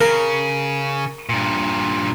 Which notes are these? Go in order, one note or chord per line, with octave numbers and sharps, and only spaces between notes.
C#3 A#4
G2 A#2